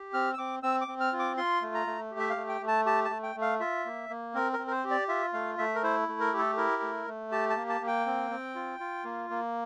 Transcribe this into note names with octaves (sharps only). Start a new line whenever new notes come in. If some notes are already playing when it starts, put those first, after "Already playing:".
Already playing: G4
C4 F6
E6
C4 D6
C4 E6
D6
C4
F6
F4
D6
F4 C6
A3
A#5
A3
G4
E5
F5
A3
G5
A3
A5
G4 A5
A5
A3
G5
A3
F5
F4 E5
A#3
A#3
C4 A#4
A#4
C4
A#4
C5
G4
D5
F4 E5
A3 F5
A3 E5
A#4
E4 C5
A3
A#4
G4
A4
E4 A#4
A3
A3
G4 A5
A5
A#3
A5
A#3
G5
C4
C4
F4
F4
A#3
A#3